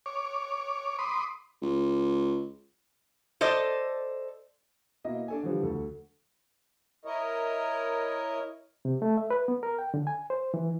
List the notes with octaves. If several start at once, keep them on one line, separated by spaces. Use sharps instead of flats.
C#5 D6
B5 C6 D6 D#6
C#2
A4 C5 D5 D#5
B2 A#3 E4 D#5
D4 A4 G#5
D3 E3 F3 G3
D2 A4
E4 A#4 C#5 D#5
C3
A3
E5
B4
B3
A#4
G5
D3
G#5
C5
E3